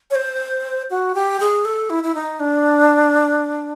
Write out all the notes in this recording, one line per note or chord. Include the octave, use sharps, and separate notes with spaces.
C#5
C5
F#4
G4
G#4
A4
E4
E4
D#4
D4